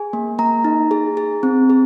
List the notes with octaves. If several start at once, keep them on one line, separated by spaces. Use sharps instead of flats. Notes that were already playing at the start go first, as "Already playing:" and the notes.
Already playing: G#4 G#5
A#3
A#3 A#5
D#4
G#4
G#4
C4
G#4